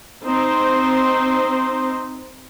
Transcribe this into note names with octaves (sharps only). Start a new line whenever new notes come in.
C4 D#4 C5